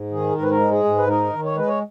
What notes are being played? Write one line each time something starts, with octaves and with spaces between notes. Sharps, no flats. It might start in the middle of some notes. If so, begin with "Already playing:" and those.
Already playing: G#2
D#3 G#4
G#2 A#4
B4
A#4
G#3
G#4
G#2
B4
D#4 A#4
D#3
C#5
G#3 B4
C#5